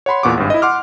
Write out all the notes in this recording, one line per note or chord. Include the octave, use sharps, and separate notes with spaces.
C#5 F#5 B5 C6
E2 A#2 B3 F#5 C#6 D6
G#1 G2
E4 D#5
F#5 C6 D6 F6